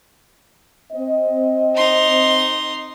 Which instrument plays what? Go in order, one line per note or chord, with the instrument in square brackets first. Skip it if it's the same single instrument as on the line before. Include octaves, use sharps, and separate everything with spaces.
[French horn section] C4 D#5
[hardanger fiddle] D#4 C6